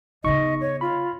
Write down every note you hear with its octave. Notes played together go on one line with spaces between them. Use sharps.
C#3 B3 D#4 D#5 C#6
C#5
F4 B5